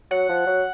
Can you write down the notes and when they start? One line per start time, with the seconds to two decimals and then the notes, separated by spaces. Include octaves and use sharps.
0.11 F#3 F#5
0.29 F3
0.47 F#3